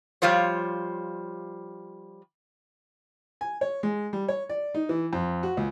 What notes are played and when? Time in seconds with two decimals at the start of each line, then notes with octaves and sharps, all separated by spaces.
0.22 F3 G3 F4 C5 C#5
3.41 G#5
3.61 C#5
3.83 G#3
4.13 G3
4.28 C#5
4.49 D5
4.74 D#4
4.89 E3
5.13 F2
5.43 F#4
5.57 C#2